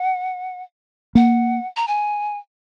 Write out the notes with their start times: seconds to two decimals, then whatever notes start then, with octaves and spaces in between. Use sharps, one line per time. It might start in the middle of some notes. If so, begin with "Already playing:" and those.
Already playing: F#5
1.15 A#3 F#5
1.76 A#5
1.88 G#5